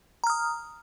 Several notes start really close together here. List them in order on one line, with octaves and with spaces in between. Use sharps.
A#5 F6 D#6